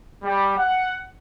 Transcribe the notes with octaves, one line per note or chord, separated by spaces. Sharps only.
G3
F#5